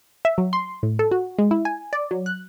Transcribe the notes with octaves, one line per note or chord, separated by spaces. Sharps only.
E5
F#3
C6
A2
A4
F#4
G#3
E4
G#5
D5
F#3
F#6